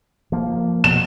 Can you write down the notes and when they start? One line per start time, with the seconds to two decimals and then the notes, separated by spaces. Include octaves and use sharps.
0.32 F3 A#3
0.84 B2 E7